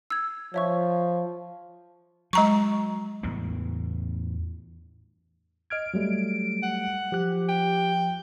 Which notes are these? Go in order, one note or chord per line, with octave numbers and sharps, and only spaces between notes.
E6 G#6
F3 C#5 E5 C#6
F#3 G#3 A#5 C#6
E2 A2 B3
D#5 F6 G#6 D7
F#3 G3 A3
F#5
F3 G4 F#6
G5